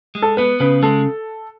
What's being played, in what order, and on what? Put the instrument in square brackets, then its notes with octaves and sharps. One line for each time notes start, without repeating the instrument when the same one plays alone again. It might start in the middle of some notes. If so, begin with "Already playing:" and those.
[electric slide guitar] G#3
[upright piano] A4
[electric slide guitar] B3 [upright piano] B4
[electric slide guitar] C#3 [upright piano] B4
[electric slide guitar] G#3 [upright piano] A4